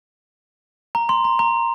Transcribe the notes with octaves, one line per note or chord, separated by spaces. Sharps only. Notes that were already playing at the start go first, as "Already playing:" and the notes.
A#5
C6
A#5
A#5